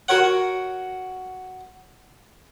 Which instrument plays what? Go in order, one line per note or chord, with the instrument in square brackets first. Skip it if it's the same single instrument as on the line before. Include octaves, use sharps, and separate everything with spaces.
[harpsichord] F#4 A#4 C#5 F#5